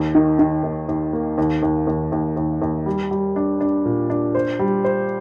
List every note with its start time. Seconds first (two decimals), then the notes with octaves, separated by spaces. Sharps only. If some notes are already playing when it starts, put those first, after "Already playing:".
Already playing: D#2
0.15 D#3
0.39 D#3
0.63 D#2
0.89 D#2
1.13 A#3
1.38 D#2
1.63 D#2
1.87 D#2
2.12 D#2
2.37 D#2
2.62 D#2
2.86 G3
3.11 G3
3.36 D4
3.60 D4
3.86 A#2
4.10 D4
4.35 C5
4.59 G3
4.84 C5